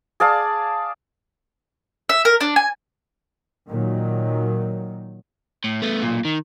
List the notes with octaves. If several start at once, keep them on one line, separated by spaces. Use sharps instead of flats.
G#4 D5 F5 A5
E5
A#4
D4
G#5
A#2 D#3 F#3
A2
A3 B3
B1 A#2
D#3